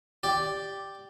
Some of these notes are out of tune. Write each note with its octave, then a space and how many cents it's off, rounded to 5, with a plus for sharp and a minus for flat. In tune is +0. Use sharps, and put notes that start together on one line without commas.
G4 +0 D5 +0